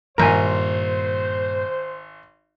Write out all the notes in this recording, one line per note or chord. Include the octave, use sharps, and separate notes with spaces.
G#1 G2 A#2 A#4 C5 E5 G#5 A#5